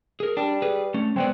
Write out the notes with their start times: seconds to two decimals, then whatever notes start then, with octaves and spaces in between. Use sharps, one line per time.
0.20 G#4 A#4
0.37 G3 D4
0.62 G#4 B4
0.94 A3 C#4
1.16 G#3 B3 C4 D5